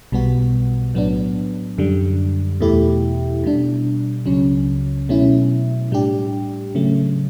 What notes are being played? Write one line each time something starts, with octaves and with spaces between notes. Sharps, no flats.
B1 B2 G3 B3 F#4
A2 F#3 B3 D4
F#2 D3 G3
E2 B2 A3 E4 G4
B2 G3 D4
C#2 C#3 F#3 C#4
B2 F#3 A3 C#4 E4
A2 G3 D4 G4
C#3 F#3 A3